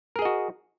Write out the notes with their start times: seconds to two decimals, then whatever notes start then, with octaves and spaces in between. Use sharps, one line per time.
0.16 A#4
0.19 G#4
0.22 D#5
0.25 F#4